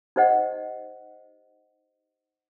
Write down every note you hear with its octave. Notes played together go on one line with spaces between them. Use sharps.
D#4 G4 C5 D#5 F#5